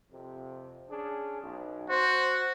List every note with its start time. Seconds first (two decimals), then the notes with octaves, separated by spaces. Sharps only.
0.12 F2 C3
0.90 C#4 D4 G#4
1.41 B1
1.90 F#4 C5